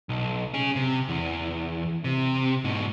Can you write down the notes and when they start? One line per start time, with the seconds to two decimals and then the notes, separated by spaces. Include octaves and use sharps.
0.09 B1
0.54 C#4 G#4
0.75 C3
1.09 E2
2.04 C3
2.64 G#2 B2